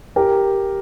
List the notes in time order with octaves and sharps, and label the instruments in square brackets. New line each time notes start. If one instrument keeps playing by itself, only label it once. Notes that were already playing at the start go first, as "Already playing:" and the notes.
[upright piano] G4 A#4